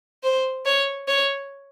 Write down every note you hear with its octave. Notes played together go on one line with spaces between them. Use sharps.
C5
C#5
C#5